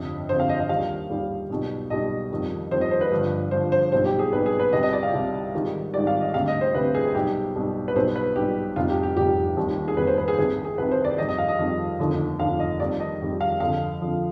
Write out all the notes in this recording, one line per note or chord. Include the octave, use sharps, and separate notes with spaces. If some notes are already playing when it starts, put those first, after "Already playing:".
Already playing: G1 F2 C3
G1 F2 C3 C5
F5
D#5
D#5
D#2 D#3 G3 F5
D#2 D#3 G3
B1 B2 G3
B1 B2 G3 D#5
F2 D#3 G3
F2 D#3 G3 C5
D#5
C5
B4
G1 G2 F3
G1 G2 F3 C5
C5
B1 B2 G3 C5
G4
G#4
B1 B2 G3 B4
G#4
B4
C2 C3 G3 D#5
D#5
D5
F5
C2 C3 G3
G#1 G#2 D#3 G3
G#1 G#2 D#3 G3 D5
F5
D#5
D2 C3 G3 F5
D#5
C5
D2 C3 G3 B4
G#4
B1 B2 G3 G4
B1 B2 G3
B4
B1 B2 G3 C5
B4
B1 B2 G3 G4
F1 F2 C3 G3 F4
G4
G4
F1 F2 C3 G3 G4
F1 D#2 D#3 G3
G#4
F1 D#2 D#3 G3 B4
C5
B4
G#4
C2 C3 D#3 G#4
G#4
C2 C3 D#3 B4
C5
D5
F2 D#3 G3 D#5
D#5
F5
D#5
F2 D#3 G3
F1 D#2 D3 F3
F1 D#2 D3 F3 F5
D#5
F2 D#3 G3 D5
D#5
F2 D#3 G3
F5
F2 D3 F3 F5
F2 D3 F3